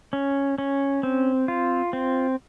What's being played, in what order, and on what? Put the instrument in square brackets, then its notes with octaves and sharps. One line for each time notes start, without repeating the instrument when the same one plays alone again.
[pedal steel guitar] C#4
C#4
C4
F4
C4